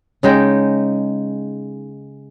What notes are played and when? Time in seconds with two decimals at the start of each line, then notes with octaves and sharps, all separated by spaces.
0.23 C#3 G#3 D#4 G5